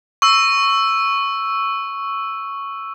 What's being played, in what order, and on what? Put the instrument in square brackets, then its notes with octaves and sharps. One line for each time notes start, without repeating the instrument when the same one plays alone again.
[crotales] C#6 E6